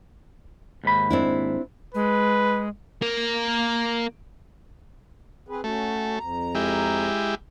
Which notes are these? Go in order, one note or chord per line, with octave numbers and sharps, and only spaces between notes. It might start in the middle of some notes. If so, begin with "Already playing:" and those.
D#2 G#2 B5
C4 D4 E4
G#3 B4
A#3 A#4
C4 G#4 B4
A3 C#4 F#4
F2 A#5
G#3 E4 G4